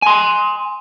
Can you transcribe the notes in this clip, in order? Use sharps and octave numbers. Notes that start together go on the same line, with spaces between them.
G#5 C6